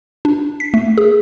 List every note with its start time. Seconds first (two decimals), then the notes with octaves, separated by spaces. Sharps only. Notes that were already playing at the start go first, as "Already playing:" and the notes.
0.25 D4
0.60 B6
0.74 A3
0.98 G#4